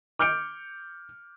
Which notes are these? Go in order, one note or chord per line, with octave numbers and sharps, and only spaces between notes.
D6 F6 G6 C#7 D7